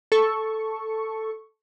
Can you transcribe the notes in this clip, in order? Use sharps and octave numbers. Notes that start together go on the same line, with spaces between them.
A4 C#6